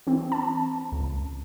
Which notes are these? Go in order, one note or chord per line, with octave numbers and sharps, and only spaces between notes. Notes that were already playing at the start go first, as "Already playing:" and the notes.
E3 C4
A5
C#2